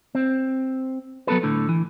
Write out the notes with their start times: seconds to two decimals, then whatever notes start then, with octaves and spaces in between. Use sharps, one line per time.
0.15 C4
1.27 F#3 B3 A4 B4
1.43 A2 D3
1.69 E3